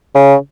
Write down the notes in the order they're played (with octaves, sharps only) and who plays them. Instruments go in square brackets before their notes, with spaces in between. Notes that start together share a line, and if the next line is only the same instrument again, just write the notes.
[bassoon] C#3